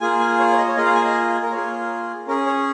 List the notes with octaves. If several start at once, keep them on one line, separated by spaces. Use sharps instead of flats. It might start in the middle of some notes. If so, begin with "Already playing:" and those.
A#3 F4 G#4 G#5
G#5
C#5
C#5
D#5
C#5
A#3 F4 G#4 D#5
F5
G#5
D#5
A#4
A#3 F4 G#4 C#5
C#4 G#4 A#4
C#5